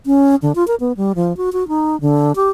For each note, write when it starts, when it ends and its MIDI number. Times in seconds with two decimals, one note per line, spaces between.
0.06 0.35 61
0.42 0.52 50
0.55 0.66 65
0.67 0.75 70
0.80 0.92 59
0.97 1.13 55
1.15 1.35 53
1.37 1.50 66
1.53 1.67 66
1.68 1.99 63
2.01 2.32 50
2.36 2.50 67